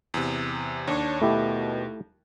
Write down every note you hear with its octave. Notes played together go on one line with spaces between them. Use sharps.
E2 C3
D#2 D4 C#5
B2 A3 E4 G4